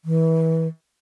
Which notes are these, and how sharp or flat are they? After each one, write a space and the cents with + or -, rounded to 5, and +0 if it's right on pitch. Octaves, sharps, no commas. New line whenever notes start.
E3 -25